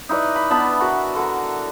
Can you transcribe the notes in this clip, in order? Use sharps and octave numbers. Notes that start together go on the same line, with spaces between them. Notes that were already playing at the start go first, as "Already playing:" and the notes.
D#4 E4 B4 D5
B5
B3 D4 A5 B5
F#4 A#4 B4 F#5
D3 A4 A#4